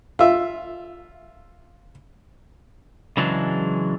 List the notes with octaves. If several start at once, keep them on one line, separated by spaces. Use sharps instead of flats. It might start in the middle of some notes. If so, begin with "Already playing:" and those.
F4 E5
C#3 E3 F#3 G#3 D4